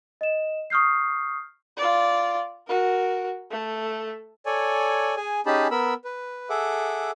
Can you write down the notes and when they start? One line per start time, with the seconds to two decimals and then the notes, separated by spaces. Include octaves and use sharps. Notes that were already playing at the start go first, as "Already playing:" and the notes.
0.21 D#5 E7
0.70 C#6 D#6 F6 G6 C7
1.77 F4 D5
2.67 F#4 A#4
3.50 A3 A4
4.46 A4 C#5 D5 G#5
5.16 G#4 G#5
5.46 C#4 D#4 G4 G#4 A5 B5
5.71 B3 A#4 B5 E6
6.05 B4
6.50 G#4 A4 E5 F#5 D6